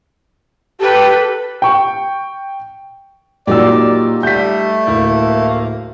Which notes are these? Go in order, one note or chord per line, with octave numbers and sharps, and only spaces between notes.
G4 A4 B4
G5 C#6
A#2 F#3 D#4 G4 D5 E6
G3 A3 G6 B6
D1 A#3 E4